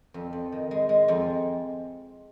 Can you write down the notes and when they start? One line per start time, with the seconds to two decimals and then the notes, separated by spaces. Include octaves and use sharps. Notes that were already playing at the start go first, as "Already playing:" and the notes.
0.14 F2
0.33 F2
0.52 D#3
0.71 G#3
0.89 G#3
1.08 F2